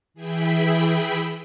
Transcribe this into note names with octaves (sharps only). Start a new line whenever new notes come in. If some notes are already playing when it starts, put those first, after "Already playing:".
E3 G#4 E5 G5 B5 E6